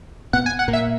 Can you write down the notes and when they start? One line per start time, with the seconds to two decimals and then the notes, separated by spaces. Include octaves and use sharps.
0.33 B2 B3 F#5
0.46 G#5
0.59 F#5
0.68 A#2 A#3
0.73 E5